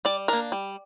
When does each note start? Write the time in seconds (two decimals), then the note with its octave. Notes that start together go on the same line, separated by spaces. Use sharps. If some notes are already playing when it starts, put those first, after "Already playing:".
0.05 G3 D5
0.28 A#3 D4 A#4
0.52 G3